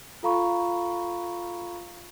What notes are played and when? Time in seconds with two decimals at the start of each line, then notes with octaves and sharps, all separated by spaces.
0.23 F4 A4 F5 A#5 B5 C#6